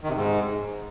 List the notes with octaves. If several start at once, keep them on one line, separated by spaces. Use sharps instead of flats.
D#3
C3
G#2